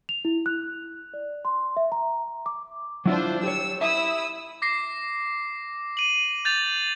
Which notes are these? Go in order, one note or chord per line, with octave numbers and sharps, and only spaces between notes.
F7
E4
F#6
D5
C6
E5
A#5
D6
F#3 D4 E4 F4 C5
G4 C#5 E6
E4 E5 D#6 E6
D6 A#6 C7
D#7 F#7
G6 A6 F7